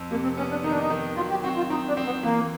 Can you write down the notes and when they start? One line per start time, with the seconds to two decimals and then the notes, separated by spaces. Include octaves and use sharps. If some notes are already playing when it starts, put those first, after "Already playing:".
Already playing: F2
0.11 C3 A#3
0.23 C4
0.37 B3 C#4
0.51 D4
0.64 D#3 D#4
0.71 D4
0.80 D#4
0.90 D#3
1.17 F#3 F4
1.30 G4
1.44 C4 F#4
1.57 F4
1.70 C4 D#4
1.88 D4
1.97 C4
2.06 B3
2.23 E3 A#3